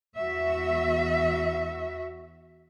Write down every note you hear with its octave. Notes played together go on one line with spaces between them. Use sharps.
E2 F#4 E5